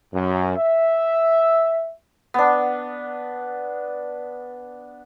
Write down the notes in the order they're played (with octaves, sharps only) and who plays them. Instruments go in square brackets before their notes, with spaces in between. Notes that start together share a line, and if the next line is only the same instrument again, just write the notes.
[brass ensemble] F#2
E5
[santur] B3 D4